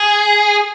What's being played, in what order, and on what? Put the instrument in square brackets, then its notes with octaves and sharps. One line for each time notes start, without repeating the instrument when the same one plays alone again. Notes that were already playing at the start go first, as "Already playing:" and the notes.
Already playing: [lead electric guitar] G#4